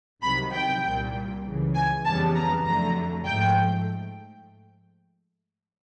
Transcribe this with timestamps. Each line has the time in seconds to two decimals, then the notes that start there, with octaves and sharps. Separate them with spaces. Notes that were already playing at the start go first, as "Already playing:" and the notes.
0.22 C2 C3 D#3 F#3 B5
0.52 G5
0.83 C2 A#2 G3
1.44 C#2 C#3 E3
1.74 G#5
2.05 F2 C#3 E3 G3 B3 A5
2.35 A#5
2.65 F2 D3 F#3 A3 A#5
3.25 G#2 F3 A3 G5